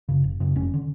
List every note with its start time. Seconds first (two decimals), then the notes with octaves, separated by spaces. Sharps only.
0.09 F#2 C#3
0.24 F#1
0.40 F#2 C#3
0.55 F1 C#4
0.74 D3